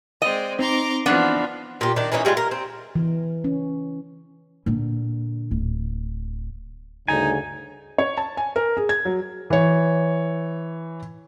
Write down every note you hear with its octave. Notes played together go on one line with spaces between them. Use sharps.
G#3 C4 D5 D#5
C4 D#4 A#5 C6 D6
E3 F3 B3 D4
A#2 G4
D#3 D4
E3 A#3 C#4 D#4
G3 G#3 E4 F4
A#4
C4
E3
C#4
A#2 D3
D1
D2 G2 C#3 D#4 G#5
C#5
A5
G#5
A#4
G#4
G#6
F#3
E3 C#5